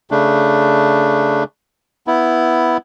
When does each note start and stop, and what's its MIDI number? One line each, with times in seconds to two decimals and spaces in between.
0.11 1.44 49
0.11 1.44 57
0.11 1.44 62
2.07 2.77 59
2.07 2.77 64